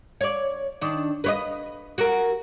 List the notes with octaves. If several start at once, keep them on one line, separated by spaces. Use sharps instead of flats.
C#5 D5
D#3 D4
B4 C#5 D#5
F#4 A#4